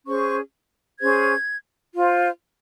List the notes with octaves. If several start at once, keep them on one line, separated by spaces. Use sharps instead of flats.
C#4 G#4 C5 C#6
C#4 G#4 C5 G#6
F4 C5